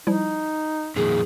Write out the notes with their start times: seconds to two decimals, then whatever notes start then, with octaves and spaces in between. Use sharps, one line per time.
0.07 F3 G3 D#4 E4
0.96 F2 A#2 D#3 G#4